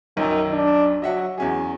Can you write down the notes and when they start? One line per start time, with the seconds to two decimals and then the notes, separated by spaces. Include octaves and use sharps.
0.17 B1 F#2 D#3 E6
0.53 D4
1.02 F#3 D#5 E5 F#5
1.38 E2 F#3 C#4 G#4